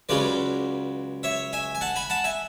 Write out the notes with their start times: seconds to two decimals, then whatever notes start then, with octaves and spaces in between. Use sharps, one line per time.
0.09 C#2 C#3 F#3 C#4 B4 D5
1.23 C#5 E5
1.53 E5 G#5
1.75 G#5
1.81 F#5 A5
1.96 G#5 B5
2.10 F#5 A5
2.24 E5 G#5